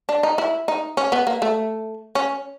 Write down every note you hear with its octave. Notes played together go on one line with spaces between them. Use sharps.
D4
D#4
E4
D#4
C#4
B3
A#3
A3
C#4